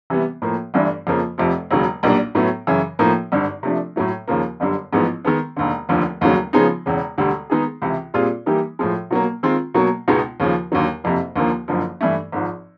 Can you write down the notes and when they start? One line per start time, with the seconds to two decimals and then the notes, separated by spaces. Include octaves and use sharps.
0.10 C3 E3 G3 B3
0.42 A2 F3 A#3
0.74 G1 G2 E3 A3 D4
1.07 F2 C#3 F3 A#3
1.38 F1 F2 C3 F3
1.71 E1 D#2 C#3 F#3
2.03 B1 A#2 G3 A#3 D4
2.35 A2 F#3 B3 E4
2.67 F#2 C#3 E3
2.99 A2 F3 A#3 D#4
3.32 G#1 G2 D3
3.63 C3 F3 A3 D4
3.96 A2 F#3 A3
4.28 D#2 C#3 F3 A#3
4.60 G1 F#2 D3 G3
4.93 A1 G#2 F3 G#3 B3
5.25 D#3 G#3 B3
5.57 E1 D#2 D3
5.89 F1 D#2 D3 F3
6.21 F1 D#2 C#3 F#3
6.53 C#3 F3 G#3 B3 D#4
6.86 E1 E2 C#3
7.18 E1 D2 D3 G3
7.50 D#3 G#3 B3 D#4 G#4
7.82 C#2 C3 E3
8.14 A#2 G3 C4 F4 G#4
8.46 E3 G3 A#3 D#4 G4
8.79 A2 F3 G#3
9.11 B2 F#3 A#3
9.43 D#3 G#3 C4 F4
9.74 B2 F#3 A#3
10.08 C#2 B2 G#3 B3 D#4
10.40 D#2 C#3 F3
10.72 D#2 D3 F#3
11.04 F#1 F2 C3
11.36 D#2 D3 F3 A#3
11.68 F#1 F#2 D3 F3
12.01 G2 E3 A3
12.32 G#1 G#2 F3